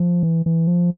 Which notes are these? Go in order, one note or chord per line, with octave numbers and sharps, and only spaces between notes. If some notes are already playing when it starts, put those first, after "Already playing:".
Already playing: F3
E3
E3
F3